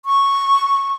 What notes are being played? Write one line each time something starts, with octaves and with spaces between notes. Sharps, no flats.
C#6